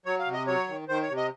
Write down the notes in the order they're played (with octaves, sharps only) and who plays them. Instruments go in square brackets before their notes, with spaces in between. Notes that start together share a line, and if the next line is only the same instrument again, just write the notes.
[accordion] F#3 C#5
F5
C3
D#5
F#3 C#5
D#3
D#3 C5
C#5
C3
D#5